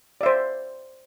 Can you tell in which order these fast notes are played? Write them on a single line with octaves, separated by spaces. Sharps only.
D5 E5 C5